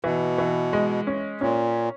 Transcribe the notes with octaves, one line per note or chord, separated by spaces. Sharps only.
B2 E3
E3
G#3
C#4
A#2 C#4